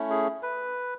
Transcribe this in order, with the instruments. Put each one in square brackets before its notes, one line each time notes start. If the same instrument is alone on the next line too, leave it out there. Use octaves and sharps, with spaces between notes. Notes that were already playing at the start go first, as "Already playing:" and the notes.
Already playing: [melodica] A3 C#4 E4
G#4
B4